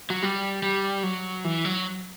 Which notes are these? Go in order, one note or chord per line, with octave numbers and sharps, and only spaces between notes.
F#3
G3
G3
F#3
E3
F#3